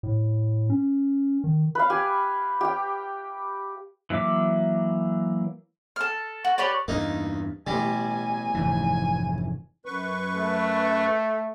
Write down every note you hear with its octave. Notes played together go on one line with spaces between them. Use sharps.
A2
C#4
D#3
B4 F5
G4 G#5
G4 G5
E3 F#3 A#3 E5 D6
A4 F6
F#4
G4 B4 C#5 D5
E2 G2 A#3 D#4
A1 B2 G3 G#5
F1 G#2 E3
F#2 B4 C#6
A3